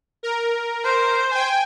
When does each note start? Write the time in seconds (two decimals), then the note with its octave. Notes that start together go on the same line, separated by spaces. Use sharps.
0.23 A#4
0.84 C5
1.31 G5 G#5